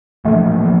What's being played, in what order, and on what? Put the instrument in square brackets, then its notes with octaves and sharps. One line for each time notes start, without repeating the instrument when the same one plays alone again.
[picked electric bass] A1 A2 F3 A#3 [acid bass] A3
[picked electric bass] F3 A#3